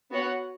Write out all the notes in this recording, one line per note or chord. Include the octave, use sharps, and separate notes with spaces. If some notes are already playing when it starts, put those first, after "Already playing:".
B3 F#4 C#5 F#5